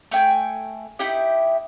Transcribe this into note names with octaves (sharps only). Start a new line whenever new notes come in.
A3 G5 G#5
D#4 E4 G4